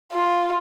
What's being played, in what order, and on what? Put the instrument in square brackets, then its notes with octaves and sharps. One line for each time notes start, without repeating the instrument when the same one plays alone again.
[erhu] F4